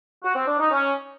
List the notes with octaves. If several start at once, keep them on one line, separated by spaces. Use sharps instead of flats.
F#4
C4
D4
D#4
C#4